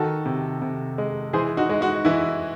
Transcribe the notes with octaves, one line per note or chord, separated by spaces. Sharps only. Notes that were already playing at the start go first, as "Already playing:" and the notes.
Already playing: D#3 F#4 A4
C3
C3
G#3
E3 G#4 C5
D#4 F#4
G#3
D#4 F#4
E3 E4